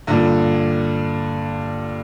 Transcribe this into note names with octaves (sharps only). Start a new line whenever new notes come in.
G2 A#2 D3